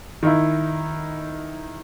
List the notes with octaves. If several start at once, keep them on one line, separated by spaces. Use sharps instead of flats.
D#3 D#4 E4